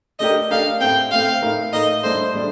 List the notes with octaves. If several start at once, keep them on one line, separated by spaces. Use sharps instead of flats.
A3 D4 G4 A#4 D#5
A3 D4 G4 A#4 F5
A2 A3 C4 G5
A2 A3 C4 F5
A2 A3 D#4 A#4
A2 A3 D#4 A#4 D#5
A2 G3 D4 A4 C5
A2 G3 D4